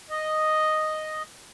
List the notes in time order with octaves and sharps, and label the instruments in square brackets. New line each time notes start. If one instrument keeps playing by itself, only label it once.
[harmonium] D#5